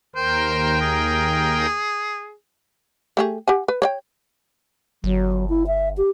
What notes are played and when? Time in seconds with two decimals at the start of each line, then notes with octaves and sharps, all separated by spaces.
0.16 D#2 A#4 C5 G5
0.81 G#4
3.17 A3 G4 G#4
3.48 G4 F#5 G#5
3.68 B4
3.82 C#5 D5 G5
5.04 G1 F#3
5.49 E4
5.67 E5
5.97 G4